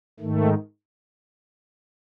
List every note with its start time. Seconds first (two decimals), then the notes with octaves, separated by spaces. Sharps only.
0.20 G#2 D#3 A3